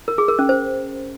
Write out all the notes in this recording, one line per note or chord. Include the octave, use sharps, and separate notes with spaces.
A#4
G#4
A#4
C#4
C5